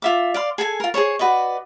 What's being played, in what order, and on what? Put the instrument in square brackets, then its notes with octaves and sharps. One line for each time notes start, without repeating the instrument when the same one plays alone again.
[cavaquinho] F4 E5 D6
D5 F5 C6
G#4 A4 G#5
F4 A#4
G#4 A4 C5 C#5
F#4 B4 D5 D#5